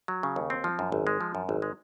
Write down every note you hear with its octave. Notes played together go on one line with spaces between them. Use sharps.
F#3
C#3
D#2
C4
F3
F#2
G#1
G#3
F3
F#2
G#1
G#3